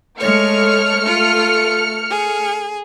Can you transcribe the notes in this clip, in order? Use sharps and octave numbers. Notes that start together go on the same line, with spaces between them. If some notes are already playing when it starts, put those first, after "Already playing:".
G#3 A3 C#5 F6 C#7
F4
G#4